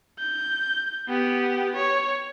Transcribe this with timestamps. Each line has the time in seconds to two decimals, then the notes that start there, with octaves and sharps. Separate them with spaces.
0.19 G6
1.09 B3 G4
1.76 C#5